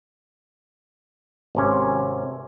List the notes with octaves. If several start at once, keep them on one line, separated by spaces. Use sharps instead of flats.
G#1 C3 C#4